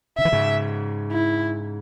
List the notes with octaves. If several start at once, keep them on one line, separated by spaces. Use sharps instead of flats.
C#3 E5
E3
G#2 C#3
E4